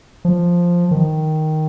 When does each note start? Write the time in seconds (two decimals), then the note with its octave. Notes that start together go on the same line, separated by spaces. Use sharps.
0.25 F3
0.91 D#3